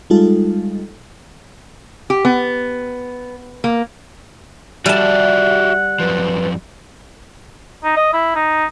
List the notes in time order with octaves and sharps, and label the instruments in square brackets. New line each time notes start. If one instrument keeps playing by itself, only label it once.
[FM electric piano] G3 G#3 D#4 F4 A4
[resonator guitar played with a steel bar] G4
B3
A#3
[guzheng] G3 A5 [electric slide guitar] F#4 G4 D5 [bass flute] E5 [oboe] F#5
[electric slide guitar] F#2 A#2 F3 [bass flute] B4
[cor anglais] D#4
D#5
E4
D#4